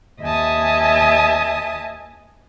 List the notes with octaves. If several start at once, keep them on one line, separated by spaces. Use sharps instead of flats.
D#2 D#5 E5 G#5 A5 D#6